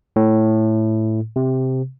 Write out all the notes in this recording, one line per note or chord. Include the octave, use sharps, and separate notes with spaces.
A2
C3